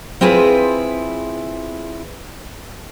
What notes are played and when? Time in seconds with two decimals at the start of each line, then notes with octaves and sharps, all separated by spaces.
0.21 C4 E4 F4 G#4 B4